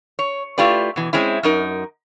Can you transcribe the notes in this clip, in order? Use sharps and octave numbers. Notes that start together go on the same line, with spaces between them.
C#5
A3 E4 F4 G4 B4 D5
B2 E3
G#3 C4 C#4 E4
F#2 D#4 A#4